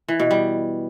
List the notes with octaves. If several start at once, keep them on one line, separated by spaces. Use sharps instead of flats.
E3
B2
G3